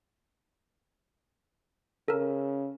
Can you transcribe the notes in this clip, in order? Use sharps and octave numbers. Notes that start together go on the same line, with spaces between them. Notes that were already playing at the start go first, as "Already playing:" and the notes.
C#3 A4 A#4